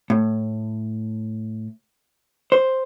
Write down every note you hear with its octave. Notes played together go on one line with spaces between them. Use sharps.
A2
C5